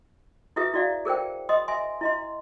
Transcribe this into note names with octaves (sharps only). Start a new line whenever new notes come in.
E4 F#4 G#4 B4 E5 D#6
E4 F#4 D5 F5
G#4 A#4 C5 G5
D#5 C6 D#6
E5 G#5 C6
E4 D#5 C6